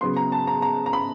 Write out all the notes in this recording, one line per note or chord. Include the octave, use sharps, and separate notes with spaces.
C#3 F#3 B3 C6
A#5
A5
A#5
A#5
A#5
B5